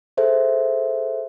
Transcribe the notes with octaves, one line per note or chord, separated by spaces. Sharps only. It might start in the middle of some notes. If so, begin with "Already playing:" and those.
G#4 A4 C5 E5